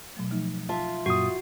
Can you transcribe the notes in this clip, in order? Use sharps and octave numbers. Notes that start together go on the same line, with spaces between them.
B2 F#3 A3
F3 A3 D#4
F4 E5 A5
F#2 A#2 F#4 D#6